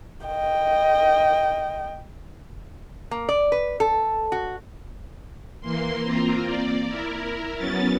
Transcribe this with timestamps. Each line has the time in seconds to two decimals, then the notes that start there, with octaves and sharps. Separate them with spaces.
0.26 D#5 G5
3.11 A#3
3.29 D5
3.52 B4
3.80 A4
4.32 F#4
5.61 E3 A#3 C6
6.03 A#3 C4 F4 A#4
6.45 D5
6.87 E4 A#4
7.56 F#3 B3 C#4 A6